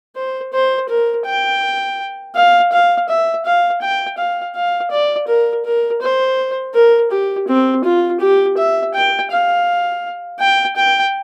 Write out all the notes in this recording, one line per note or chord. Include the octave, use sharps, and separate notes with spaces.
C5
C5
A#4
G5
F5
F5
E5
F5
G5
F5
F5
D5
A#4
A#4
C5
A#4
G4
C4
F4
G4
E5
G5
F5
G5
G5